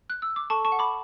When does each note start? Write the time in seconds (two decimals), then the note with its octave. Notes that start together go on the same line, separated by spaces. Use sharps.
0.10 F#6
0.22 E6
0.36 D6
0.50 A4 A5 C#6
0.65 A5 C#6
0.72 F#5
0.79 B5 D6